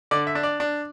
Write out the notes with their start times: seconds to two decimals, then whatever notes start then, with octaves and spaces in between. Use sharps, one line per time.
0.11 D3 D5
0.27 E5
0.35 D4
0.43 D5
0.60 D4